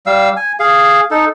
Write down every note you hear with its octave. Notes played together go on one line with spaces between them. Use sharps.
G3 F5 E6
G#5
G#4 F5
D#4 A4